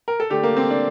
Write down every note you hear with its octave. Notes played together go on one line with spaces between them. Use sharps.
A#4
A4
D3 A3 G4
A#3
C4
D4